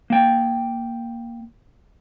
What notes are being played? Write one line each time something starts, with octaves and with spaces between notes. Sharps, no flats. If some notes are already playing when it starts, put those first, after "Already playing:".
A#3 G5